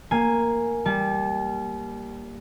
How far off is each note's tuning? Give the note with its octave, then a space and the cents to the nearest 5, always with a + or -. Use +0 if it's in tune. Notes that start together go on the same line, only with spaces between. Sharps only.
A#3 +0 G#5 +0
G3 +0 A5 -40